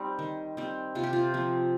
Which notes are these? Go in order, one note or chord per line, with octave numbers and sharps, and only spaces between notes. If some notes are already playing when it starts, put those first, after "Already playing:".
Already playing: G3 C4 D#4
D#3
G3 C4
C3 F4
G4
F4
F3 C4